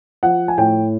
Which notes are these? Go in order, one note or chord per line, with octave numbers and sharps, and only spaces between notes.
F3 F#5
G#5
A2 G5